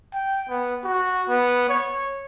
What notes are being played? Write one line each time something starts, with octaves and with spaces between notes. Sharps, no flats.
G5
B3
F#4
B3
C#5